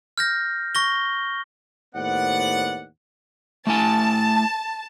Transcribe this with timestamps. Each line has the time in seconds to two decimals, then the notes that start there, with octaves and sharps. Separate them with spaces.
0.18 F6 G6 A#6
0.75 C#6 A#6 G7
1.95 D#2 A2 B3 C5 D5 F#5
3.67 A3 E4 G#5 A5